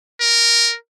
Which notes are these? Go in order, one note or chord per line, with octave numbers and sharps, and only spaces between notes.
A#4